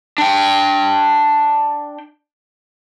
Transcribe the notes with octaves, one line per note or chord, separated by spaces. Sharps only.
D4 G5